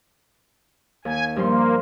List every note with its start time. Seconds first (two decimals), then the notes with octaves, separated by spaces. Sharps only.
1.05 D#2 G#5
1.36 G2 F3 A#3 C6